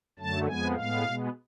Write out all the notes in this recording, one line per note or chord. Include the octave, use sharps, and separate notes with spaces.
F#2 D3 F#3 A3 A5
F2 F3 G#3 B3 G#5
A2 G#3 B3 F5
B2 G#3 B3